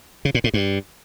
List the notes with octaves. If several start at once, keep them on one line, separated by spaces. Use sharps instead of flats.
C#3
A#2
A2
G2